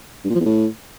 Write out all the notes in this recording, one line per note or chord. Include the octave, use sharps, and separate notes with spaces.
G2
A#2
F3
E2
A2